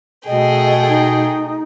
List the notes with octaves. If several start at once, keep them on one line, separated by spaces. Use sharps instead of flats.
B2 A3 G#4 D#5 G5
D#4